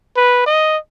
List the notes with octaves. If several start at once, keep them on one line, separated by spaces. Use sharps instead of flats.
B4
D#5